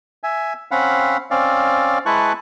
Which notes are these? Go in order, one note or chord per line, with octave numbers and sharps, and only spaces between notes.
E5 G#5
C4 C#4 F5 F#5 B5
C4 C#4 D5 F5
G#3 E4 B4 A5 C#6 F#6